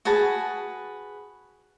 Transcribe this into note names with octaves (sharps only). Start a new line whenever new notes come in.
F#4 G#4 B4 A5